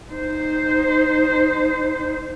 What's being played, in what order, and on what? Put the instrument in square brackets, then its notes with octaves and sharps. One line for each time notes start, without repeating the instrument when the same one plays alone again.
[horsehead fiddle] D#4 C5